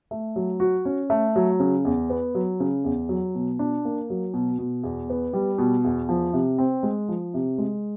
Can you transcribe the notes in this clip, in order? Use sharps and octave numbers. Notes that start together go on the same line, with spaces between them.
A3
F#3
F#4
C#4
A3
F#3
C#3
E2
B3
F#3
C#3
E2
F#3
B2
D4
A#3
F#3
B2
B2
E2
B3
G3
B2
E2
F3
C3
C4
G#3
F3
C3
G#3